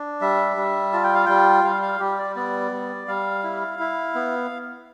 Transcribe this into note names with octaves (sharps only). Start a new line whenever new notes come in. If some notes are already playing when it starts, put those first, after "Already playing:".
Already playing: D4
G3 E5
G3
F4 A5
G5
F5
G3 G5
G3 F5
F5
G3 G4
D5
B3 D5
G3
G3 F5
E4
E4
B3